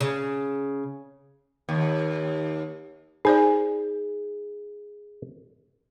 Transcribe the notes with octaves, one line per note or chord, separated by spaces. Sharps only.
C#3
D#2
D#4 G#4 C5 D5